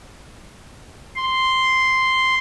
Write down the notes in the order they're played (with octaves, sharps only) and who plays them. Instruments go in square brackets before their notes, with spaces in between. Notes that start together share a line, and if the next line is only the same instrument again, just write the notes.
[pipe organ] C6